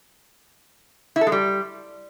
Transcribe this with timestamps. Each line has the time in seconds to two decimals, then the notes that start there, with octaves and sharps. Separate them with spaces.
1.16 E4
1.21 A4
1.27 G#3
1.32 G3